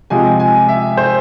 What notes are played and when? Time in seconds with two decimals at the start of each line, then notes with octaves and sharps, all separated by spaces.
0.10 C3 F3 G#3 G#5
0.40 G#5
0.69 E5
0.97 C5